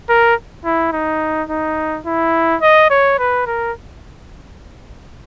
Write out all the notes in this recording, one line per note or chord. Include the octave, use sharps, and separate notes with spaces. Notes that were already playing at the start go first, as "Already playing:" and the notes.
A#4
E4
D#4
D#4
E4
D#5
C#5
B4
A#4